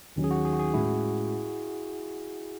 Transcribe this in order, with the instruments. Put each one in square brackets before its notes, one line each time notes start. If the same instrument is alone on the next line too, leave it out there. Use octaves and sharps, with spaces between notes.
[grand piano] D#2 D#3 F#3 C#4
[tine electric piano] G#4
F#4
G#4
F#4
G#4
[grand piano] A2 G#3 C#4 F#4 [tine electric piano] E4